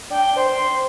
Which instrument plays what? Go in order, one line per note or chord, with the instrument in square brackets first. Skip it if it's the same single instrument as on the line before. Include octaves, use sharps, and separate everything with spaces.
[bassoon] D4 [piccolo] G5
[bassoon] C5 [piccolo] C6